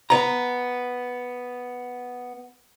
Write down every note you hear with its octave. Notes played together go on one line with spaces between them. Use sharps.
B3 A#5